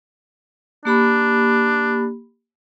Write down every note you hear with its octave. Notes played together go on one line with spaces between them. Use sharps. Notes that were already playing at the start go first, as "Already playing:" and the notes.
A#3 D4 G4 B5